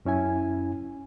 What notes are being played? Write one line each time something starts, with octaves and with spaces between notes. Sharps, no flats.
F#2 C#4 E4 G#5